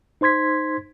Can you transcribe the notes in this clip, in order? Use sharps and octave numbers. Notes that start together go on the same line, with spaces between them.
D#4 C5 C6 G#6 B6